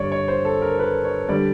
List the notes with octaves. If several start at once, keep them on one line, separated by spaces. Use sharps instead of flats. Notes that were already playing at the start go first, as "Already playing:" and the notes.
Already playing: G2 D3 G3 C#5 D5
C#5
C5
A4
A#4
B4
C#5
D3 G3 D5